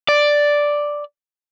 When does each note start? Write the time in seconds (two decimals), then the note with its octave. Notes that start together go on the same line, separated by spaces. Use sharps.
0.09 D5